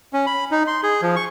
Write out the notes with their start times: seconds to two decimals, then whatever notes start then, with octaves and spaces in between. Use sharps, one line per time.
0.13 C#4
0.27 B5
0.51 D#4
0.67 C6
0.83 G#4
1.02 F3
1.16 C#6